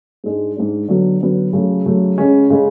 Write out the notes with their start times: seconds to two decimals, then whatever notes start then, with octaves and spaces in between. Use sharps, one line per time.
0.24 G#2 G#3 D4
0.56 G#2 G#3 D4
0.88 D3 F#3 B3 F#4
1.21 D3 F#3 B3 F#4
1.53 C#3 F#3 A3
1.86 C#3 F#3 A3
2.18 C#3 G#3 C#4
2.50 C#3 G#3 C#4